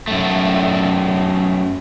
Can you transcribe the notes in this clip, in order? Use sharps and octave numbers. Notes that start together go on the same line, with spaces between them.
F#2 A3